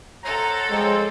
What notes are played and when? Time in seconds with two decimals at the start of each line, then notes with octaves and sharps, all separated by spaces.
0.24 A4 C5 C#5 F#5 A#5
0.70 F3 G#3 C4